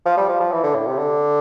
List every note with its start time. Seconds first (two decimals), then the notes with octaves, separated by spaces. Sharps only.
0.06 F3
0.18 G3
0.29 F3
0.41 F3
0.52 E3
0.64 D3
0.75 A2
0.87 C3
0.98 D3